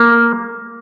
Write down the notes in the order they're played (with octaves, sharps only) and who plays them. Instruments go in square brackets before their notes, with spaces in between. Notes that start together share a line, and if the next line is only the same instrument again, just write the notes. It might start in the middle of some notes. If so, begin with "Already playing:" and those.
Already playing: [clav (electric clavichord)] A#3